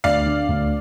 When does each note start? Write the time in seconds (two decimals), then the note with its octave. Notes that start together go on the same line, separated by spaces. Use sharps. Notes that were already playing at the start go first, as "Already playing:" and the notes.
0.04 D2 D5 F5
0.26 D3
0.49 D2